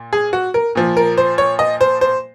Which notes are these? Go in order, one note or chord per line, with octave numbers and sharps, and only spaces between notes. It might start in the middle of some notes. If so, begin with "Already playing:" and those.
Already playing: A#2
G#4
F#4
A#4
A#2 F3
A#4
C5
C#5
D#5
C5
C5